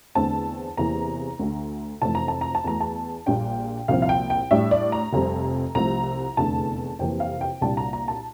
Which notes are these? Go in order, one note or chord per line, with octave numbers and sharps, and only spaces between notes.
E2 D3 A3 C4 A5
E2 C3 E3 A#3 A#5
D2 D3 A3
F1 F2 E3 A3 A5
A#5
A5
A#5
A5
E2 E3 A3 A#5
A5
A#1 A#2 G3 D4 G5
C2 A#2 F3 C4 F5
F5
G5
G5
A2 G3 D4 E5
D5
A#5
F1 F2 C3 G3 C4
C2 C3 F3 A3 A#5
F1 E2 D3 A3 A5
F2 C3 E3 A#3 G5
F5
G5
C2 A#2 G3 D4 A5
A#5
A#5
A5